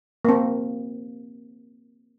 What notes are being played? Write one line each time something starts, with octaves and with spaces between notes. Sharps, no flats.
A#3 C4